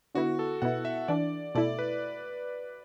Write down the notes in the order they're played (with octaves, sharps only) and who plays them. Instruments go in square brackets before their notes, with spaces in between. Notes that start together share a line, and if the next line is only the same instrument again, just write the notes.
[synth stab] D3 B3 E4 [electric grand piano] F#4
[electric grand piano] A4
[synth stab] B2 B3 E4 [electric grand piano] F#5
[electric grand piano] E5
[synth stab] E3 D4 [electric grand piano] D5
[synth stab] B2 A3 E4 [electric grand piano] D5
[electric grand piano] B4